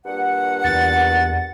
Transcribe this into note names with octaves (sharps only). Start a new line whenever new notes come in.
G2 A#2 F#5
E2 A6